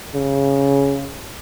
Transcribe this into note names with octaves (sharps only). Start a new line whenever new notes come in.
C#3